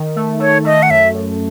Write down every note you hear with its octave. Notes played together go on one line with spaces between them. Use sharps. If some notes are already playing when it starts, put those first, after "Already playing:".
Already playing: D#3
A3
A3 C#5
A3 D#5
F#5
F#2 E5
F#2